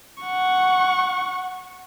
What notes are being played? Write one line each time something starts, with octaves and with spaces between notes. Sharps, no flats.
F#5 C#6